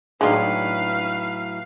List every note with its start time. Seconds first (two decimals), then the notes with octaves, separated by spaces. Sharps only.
0.21 A2 F3 F#3 G#3 D4 D#4 B4 F5